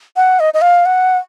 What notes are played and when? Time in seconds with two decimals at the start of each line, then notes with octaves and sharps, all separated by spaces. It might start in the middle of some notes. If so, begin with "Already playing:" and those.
0.16 F#5
0.40 D#5
0.54 D#5
0.61 F5
0.86 F#5